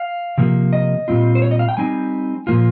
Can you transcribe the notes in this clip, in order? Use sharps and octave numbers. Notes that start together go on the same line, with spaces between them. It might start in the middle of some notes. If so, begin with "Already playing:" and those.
Already playing: F5
C3 F3 A#3
D#5
A#2 G3 C4 F4
C5
C#5
D#5
F5
G5
G3 C4 D#4 G#5
A#2 F3 A#3 F4